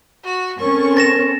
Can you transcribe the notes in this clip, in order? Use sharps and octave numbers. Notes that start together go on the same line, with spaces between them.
F#4
C4 C#4 A4 A#4 C#6
A6 A#6 E7